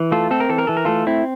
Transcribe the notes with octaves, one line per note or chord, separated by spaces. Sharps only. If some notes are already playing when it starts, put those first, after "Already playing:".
Already playing: E3
A3 F4 A4
C4 A4
A#4
E3 A4
A#4
E3 A4
A#4
A3 F4 A4
C4 E4